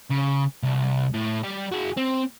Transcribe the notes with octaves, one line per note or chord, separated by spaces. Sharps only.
C#3
C2
A2
G3 G4
F#4 G#4
C4